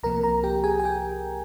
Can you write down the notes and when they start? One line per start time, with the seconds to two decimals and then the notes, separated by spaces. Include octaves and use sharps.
0.03 C2 C3 F3 A#3 A#4 A#5
0.23 A#4 A#5
0.43 G4 G5
0.64 G#4 G#5
0.80 G#5
0.84 G4 G5